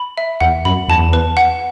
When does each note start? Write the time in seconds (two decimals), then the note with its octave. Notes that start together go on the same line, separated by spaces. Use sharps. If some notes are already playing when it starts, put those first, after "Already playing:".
Already playing: B5
0.18 E5
0.40 E2 F#5
0.65 F#2 B5
0.88 E2 A5
1.13 B4
1.37 F#5